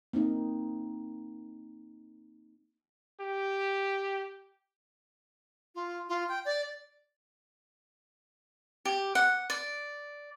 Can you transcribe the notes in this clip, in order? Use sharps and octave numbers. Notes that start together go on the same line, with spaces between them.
A#3 C4 D#4
G4
F4
F4
G5
D5
G4
F#5
D5